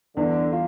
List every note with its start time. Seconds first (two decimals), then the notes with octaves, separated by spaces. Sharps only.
0.17 E2 D3
0.52 F4